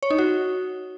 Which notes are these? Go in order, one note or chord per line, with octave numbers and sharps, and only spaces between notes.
C#5
D#4
F#4